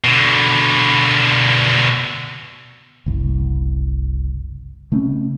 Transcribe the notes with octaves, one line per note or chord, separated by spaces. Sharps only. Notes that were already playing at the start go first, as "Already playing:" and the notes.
B2 D3
F#1 C2
C#3 A3 C4 C#4